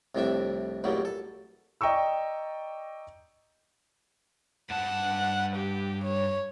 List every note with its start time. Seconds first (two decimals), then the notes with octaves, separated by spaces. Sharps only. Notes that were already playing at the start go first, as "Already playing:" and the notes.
0.15 C2 F2 A2 C4 D4 E5
0.84 A1 E2 A#2 F#3 G3
1.05 A4
1.81 D5 D#5 G5 A#5 C#6 E6
4.70 G2 F#5 A5
5.56 G4
6.04 C#5